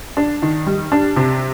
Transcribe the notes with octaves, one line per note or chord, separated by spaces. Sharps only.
D4
D#3
G3
D4
C3